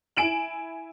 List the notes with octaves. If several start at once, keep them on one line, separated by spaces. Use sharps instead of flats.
E4 G#5 D7 E7 F#7